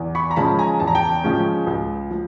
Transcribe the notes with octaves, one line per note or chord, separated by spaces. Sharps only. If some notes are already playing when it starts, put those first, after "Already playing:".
Already playing: E2
B5 C#6
A#5
C#3 F3 G#3 C#4 A5 B5
G#5 A#5
E2 A5
A#5
G5 A5
C#3 F3 G#3 C#4
C#2
F3